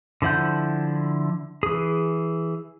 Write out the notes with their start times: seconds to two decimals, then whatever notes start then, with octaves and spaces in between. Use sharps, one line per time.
0.22 D3 F3 E4 F#5 G6
1.63 E3 G#4